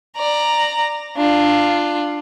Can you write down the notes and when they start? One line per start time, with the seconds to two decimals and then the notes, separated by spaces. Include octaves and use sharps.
0.16 D5 A#5
1.17 D4 F4